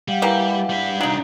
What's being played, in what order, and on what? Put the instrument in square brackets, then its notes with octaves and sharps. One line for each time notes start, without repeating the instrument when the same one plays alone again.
[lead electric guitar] G3 [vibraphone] F5 F#5
[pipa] E3 A#3 G4
[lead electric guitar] G3 B4
[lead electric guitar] C2 D4 [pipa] F#3 D#4